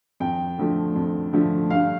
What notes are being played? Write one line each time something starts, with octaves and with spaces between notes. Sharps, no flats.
F2 G5
D3 F3 A3
F2
D3 F3 A3
G2 F5